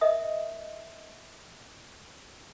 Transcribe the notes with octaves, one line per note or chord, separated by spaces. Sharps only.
A#4 D#5 E5 D#6